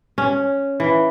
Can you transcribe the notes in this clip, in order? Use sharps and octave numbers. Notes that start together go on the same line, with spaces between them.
C#4
E3